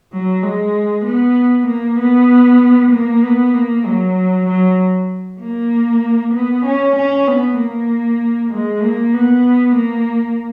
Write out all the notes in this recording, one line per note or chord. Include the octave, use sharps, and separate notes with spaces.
F#3
G#3
B3
A#3
B3
A#3
B3
A#3
F#3
F#3
A#3
B3
C#4
C#4
B3
A#3
G#3
A#3
B3
A#3